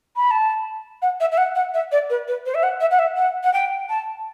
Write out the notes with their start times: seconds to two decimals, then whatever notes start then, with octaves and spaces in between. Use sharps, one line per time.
0.16 B5
0.31 A5
1.02 F#5
1.20 E5
1.32 E5
1.38 F#5
1.55 F#5
1.74 E5
1.92 D5
2.10 B4
2.28 B4
2.46 C5
2.55 E5
2.63 F#5
2.81 E5
2.91 F#5
2.99 E5
3.17 F#5
3.44 F#5
3.53 G5
3.89 A5